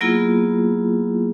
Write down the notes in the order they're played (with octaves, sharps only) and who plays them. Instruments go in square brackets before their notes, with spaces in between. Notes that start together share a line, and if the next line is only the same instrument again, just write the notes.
[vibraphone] F#3 A#3 B3 E4 F4 G#4